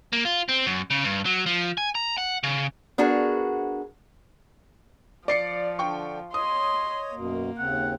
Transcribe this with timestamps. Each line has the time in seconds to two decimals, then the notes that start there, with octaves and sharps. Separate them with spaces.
0.13 A#3
0.25 F4
0.49 C4
0.66 F#2
0.90 C#3
1.04 G2
1.25 F#3
1.46 F3
1.78 G#5
1.95 A#5
2.18 F#5
2.43 C#3
2.98 B3 D4 F#4 G#4 A#4
5.28 F3 D5 C7 C#7
5.79 D3 D4 G5 C#6
6.34 C#5 D#5 C6 D#6
7.15 F#2 B2 A#3
7.58 D#2 C#3 C4 F#5